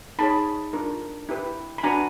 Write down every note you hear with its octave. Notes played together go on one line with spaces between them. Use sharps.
D#4 G#4 C#5 A5 B5
D4 F4 A#4
E4 G4 B4
B5
D4 F#4 B4 G#5 A#5